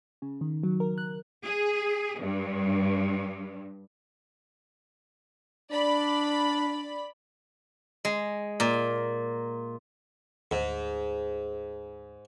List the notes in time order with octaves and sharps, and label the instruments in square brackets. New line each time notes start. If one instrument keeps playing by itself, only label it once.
[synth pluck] C#3
D#3
F#3
A#4
F#6
[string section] G#4
G2
[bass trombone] D4 [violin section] D5 B5
[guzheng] G#3
A#2
[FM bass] D2 [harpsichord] G#2